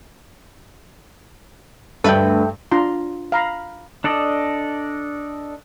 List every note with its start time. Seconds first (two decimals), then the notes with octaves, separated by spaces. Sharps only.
2.04 D2 G2 A4 B4 E5 G5
2.71 D4 F4 A#5 C6
3.32 F5 A#5 B5
4.04 D4 A4 D5 D#5